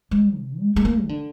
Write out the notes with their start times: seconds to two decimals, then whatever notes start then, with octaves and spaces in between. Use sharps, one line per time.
0.11 G#3
0.37 C3
0.60 G#3
0.76 G#3
0.85 A#3
1.03 D#3
1.09 D3